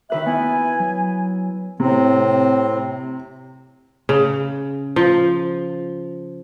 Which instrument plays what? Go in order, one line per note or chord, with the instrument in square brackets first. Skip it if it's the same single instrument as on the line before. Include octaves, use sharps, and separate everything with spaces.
[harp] D#3 B4 F#6 [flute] E5
[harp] B3 E4 [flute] G#5
[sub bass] F#3
[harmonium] A2 C4 [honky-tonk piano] C3
[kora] C#3
F3